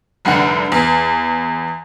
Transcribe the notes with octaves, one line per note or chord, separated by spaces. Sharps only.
F1 C2 D3 F#5
E2